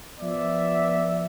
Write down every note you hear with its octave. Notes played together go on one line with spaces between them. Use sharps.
F3 B3 D5 E5